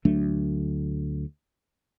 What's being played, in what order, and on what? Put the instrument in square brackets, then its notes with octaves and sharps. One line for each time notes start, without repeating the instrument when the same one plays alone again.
[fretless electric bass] D2 F#3 A3 D4